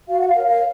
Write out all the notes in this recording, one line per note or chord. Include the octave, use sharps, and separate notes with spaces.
F#4 F5
F#5
F5
A#4 C#5
F5